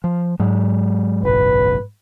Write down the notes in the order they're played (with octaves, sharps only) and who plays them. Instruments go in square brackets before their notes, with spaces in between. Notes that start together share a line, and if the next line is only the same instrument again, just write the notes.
[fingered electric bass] F3
[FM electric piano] G#2 [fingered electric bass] F#3 G#3
[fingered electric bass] F#1 B1 [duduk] B4